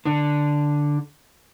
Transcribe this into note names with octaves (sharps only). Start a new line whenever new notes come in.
D3